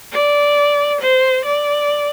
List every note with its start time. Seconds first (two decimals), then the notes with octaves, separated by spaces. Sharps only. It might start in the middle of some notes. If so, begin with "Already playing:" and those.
0.12 D5
1.01 C5
1.45 D5